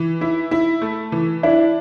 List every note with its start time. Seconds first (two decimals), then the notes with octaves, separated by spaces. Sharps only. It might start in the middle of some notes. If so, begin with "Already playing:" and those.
Already playing: E3
0.21 E4
0.51 E4
0.82 A3
1.12 E3
1.43 D4 E4